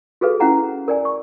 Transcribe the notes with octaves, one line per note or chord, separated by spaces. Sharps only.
F#4 G#4 A4 B4 F5
C#4 E4 F5 F#5 A#5
A#4 D5 G#5
C#6